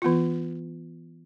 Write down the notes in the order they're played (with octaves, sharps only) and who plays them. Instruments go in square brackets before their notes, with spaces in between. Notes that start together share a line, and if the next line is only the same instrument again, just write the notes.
[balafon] E3 B3 F4